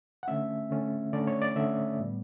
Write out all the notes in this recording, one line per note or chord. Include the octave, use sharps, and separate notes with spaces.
F#5
D3 A3 C#4 E5
D3 A3 C#4
D3 A3 C#4 D5
C#5
D5
D3 A3 C#4 E5
A2 G3 B3